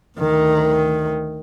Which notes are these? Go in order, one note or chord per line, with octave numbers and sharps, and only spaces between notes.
D2 D#3